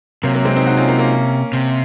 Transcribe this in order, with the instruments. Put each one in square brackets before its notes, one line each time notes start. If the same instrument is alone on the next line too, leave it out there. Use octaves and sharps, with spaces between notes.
[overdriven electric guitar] C3 [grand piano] F#3 A#3
[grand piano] F#3 A#3
G#3 C4
C4 D#4
D#4 F#4
C#4 F4
A#3 C#4
A#3 C#4
[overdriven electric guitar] C3